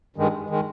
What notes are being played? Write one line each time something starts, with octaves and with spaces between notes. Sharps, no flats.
G2 D#3 G#3
D#3 G#3